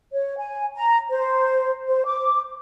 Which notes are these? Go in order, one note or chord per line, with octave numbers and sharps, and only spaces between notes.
C#5
G#5
A#5
C5
C5
D6